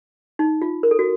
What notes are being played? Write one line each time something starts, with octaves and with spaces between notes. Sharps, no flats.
D#4
F4
A#4
A4
F#4